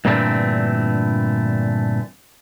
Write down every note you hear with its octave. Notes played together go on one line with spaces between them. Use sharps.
G2 A#2 D3 E3 A3 C4